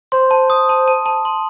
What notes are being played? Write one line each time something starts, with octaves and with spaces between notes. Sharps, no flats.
C5 C6
A5
D#6
A5
A5
A5
C6